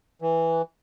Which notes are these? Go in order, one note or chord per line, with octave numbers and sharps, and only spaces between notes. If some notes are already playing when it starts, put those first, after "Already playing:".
E3